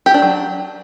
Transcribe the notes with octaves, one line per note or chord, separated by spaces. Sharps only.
G4
D4
F#3